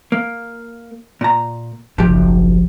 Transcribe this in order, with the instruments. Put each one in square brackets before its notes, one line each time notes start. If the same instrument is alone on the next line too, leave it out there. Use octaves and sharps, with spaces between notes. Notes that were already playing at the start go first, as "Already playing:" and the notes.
[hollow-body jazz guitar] A#3
A#2 A#5
[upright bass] F#1 B1 [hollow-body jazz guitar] F3 G4